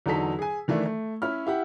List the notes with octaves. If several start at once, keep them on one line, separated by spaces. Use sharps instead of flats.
E2 D3 F#3 D#4 A4 B6
G#4 G#5
D#3 E3 A3 D4 E4
A3
C#4 E4 C#5 B5 F6
E4 G4 F#5